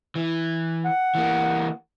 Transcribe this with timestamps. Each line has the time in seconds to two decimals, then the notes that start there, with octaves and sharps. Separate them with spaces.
0.15 E3
0.85 F#5
1.15 E3 A#3